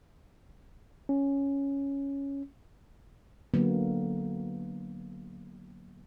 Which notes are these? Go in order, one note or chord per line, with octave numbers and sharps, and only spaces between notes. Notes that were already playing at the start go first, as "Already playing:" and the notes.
C#4
D3 F#3 A#3 B3